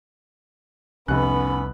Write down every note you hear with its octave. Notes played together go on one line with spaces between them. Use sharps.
F1 C2 B3 C#4 B5 F#6